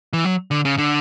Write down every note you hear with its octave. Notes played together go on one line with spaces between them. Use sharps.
E3
F#3
D3
C#3
D3